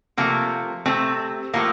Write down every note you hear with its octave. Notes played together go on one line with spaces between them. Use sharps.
C3 F3 A3 A#3
C3 F3 A3 C4
A2 F3 A3 A#3